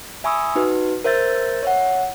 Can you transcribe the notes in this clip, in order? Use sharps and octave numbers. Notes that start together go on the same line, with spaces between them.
E5 G#5 B5 C#6 D#6 E6
D#4 F#4 B4
A#4 C5 E5 G6 A6
C#5 E5 F#5